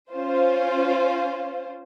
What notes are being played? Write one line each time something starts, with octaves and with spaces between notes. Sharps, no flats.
C#4 F4 C5